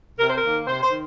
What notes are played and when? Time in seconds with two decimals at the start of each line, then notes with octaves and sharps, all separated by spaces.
0.19 C3 A#4
0.29 C5
0.38 A#4
0.44 D#3 A#3
0.67 C3 C5
0.83 C5
0.91 D#3